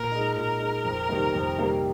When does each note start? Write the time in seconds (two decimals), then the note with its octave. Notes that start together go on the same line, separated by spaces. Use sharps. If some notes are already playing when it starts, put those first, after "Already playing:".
Already playing: A#2 A#4
0.11 G#3 D#4
0.36 A#2 A#4
0.60 G#3 D#4
0.85 F2
1.09 C3 D#3 G3 A#3
1.33 F2
1.58 C3 D#3 G3 A#3